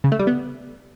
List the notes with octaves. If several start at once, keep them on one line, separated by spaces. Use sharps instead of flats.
C#3
A3
G3
B3